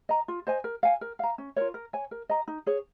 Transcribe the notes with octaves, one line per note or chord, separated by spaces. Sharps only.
D#5 A#5
F4
C5 D#5 G#5
A#4
F5 G#5
A#4
F5 A#5
C#4
F4 A#4 C#5
A#4
C#5 G#5
A#4
D#5 A#5
D#4
G#4 C#5